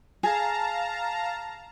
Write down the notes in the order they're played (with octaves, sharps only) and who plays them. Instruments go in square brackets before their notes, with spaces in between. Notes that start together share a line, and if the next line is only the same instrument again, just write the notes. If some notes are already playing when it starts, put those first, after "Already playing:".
[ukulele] G#4 [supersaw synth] F5 A5 A#5